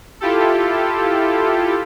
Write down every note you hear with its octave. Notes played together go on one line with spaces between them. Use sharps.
E4 F4 G4 A4